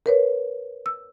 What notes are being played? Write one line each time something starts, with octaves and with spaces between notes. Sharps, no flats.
A#4 B4 C#5
E6